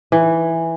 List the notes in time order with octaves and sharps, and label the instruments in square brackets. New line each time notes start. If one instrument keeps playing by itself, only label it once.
[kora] E3